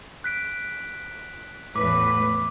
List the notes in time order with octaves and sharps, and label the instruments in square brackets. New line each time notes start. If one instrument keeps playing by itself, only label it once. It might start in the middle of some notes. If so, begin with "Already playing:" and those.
[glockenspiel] F#6 B6 D7
[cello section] E2 A2 B4 [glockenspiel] D6